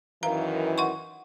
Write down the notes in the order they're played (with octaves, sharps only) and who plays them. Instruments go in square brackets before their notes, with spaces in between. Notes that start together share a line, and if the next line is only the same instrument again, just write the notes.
[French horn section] F#2 D#3 E3 [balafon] F5 A#5
[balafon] F#5 C6 C#6